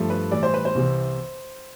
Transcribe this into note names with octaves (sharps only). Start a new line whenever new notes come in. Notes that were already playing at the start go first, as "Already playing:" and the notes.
Already playing: G2 F3 A3
B4
A2 E3 G3 D5
C5
B4
C5
C2 C3 E3